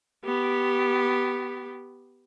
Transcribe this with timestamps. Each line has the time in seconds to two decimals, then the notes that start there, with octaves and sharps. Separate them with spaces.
0.24 B3 G4